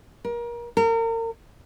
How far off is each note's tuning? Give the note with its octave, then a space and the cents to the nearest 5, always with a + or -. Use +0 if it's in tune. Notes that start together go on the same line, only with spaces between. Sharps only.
A#4 +30
A#4 -35